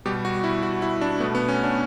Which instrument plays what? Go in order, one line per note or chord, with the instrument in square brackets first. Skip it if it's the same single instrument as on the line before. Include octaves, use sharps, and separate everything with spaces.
[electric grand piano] B2 G3 G4
F#4
E4
F#4
E4
D4
A3 B3
B2
B3
C#4
D4